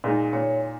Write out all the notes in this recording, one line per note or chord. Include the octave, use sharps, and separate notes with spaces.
A#2 G#3 D#4
A#2 C#5